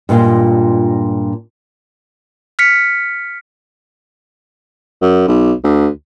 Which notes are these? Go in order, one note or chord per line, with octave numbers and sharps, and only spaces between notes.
G2 A#2 G#3 F4
F6 B6 C#7
F#2
B1
D2